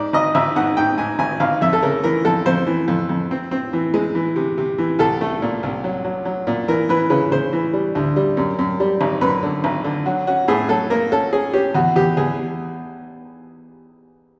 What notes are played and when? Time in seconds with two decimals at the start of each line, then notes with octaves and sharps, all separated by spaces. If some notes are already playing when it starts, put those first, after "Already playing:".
Already playing: G#2 D5
0.13 G#1 D#5
0.35 G#1 E5
0.56 G#2 F#5
0.77 G#2 G5
0.98 G#2 G#5
1.19 G#1 G#5
1.40 G#1 F5
1.61 F2 E5
1.73 A4
1.82 C#3 A#4
2.04 E3 A#4
2.25 F2 A4
2.46 F2 C5
2.67 E3
2.88 F2
3.09 F2
3.31 C4
3.51 C4
3.73 E3
3.94 G#3
4.15 E3
4.36 C3
4.58 C3
4.78 E3
4.99 C2 A4
5.21 A3
5.42 A#2
5.63 C2
5.84 F#3
6.05 F#3
6.25 F#3
6.47 A#2
6.68 E3 A#4
6.89 E3 B4
7.10 C#3 B4
7.32 C#3 C5
7.53 E3
7.73 G3
7.95 D2
8.16 G3
8.37 F#2
8.59 F#2
8.80 G3
9.01 G#1
9.21 F#2 B4
9.43 D3
9.64 G#1
9.84 D3
10.06 F#3 F#4
10.27 C#4 F#4
10.48 A2 G#4
10.69 F#3 A4
10.90 A#3 A#4
11.11 C#4 A4
11.33 C#4 G#4
11.53 C#4 G4
11.74 E2 F#4
11.96 E2 G4
12.17 E2 G#4